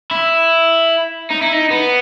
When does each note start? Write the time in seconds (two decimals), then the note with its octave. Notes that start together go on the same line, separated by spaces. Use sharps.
0.11 E4
1.30 D#4
1.41 E4
1.53 D#4
1.71 B3